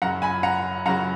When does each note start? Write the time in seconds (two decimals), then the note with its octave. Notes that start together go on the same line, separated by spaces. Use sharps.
0.02 F#2 C#3 F#3 F#5 A#5
0.22 G#5 B5
0.43 F#5 A#5
0.86 F#2 C#3 F#3 F#5 A#5